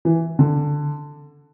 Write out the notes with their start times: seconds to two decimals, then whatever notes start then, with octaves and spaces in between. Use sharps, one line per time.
0.05 E3
0.39 D3